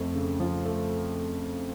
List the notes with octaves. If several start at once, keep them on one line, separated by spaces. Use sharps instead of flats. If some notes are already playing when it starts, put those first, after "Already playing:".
Already playing: F2 F3 A3
C#3
F3
A3